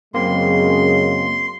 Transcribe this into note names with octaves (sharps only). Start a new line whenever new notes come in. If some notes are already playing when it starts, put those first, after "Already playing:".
F#2 C#3 G#3 A#3 C4 C6